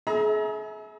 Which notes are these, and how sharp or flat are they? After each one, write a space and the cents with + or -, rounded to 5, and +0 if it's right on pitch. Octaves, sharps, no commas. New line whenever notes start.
G#4 +40 E5 -25 A#5 +30